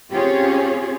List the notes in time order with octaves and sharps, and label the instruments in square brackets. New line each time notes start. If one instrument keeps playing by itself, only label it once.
[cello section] C4 C#4 F4 G4 G#4 C#5